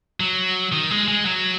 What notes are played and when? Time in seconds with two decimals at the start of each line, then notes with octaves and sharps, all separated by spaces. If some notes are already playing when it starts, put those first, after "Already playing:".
0.20 F#3
0.72 D#3
0.91 G#3
1.08 G#3
1.25 F#3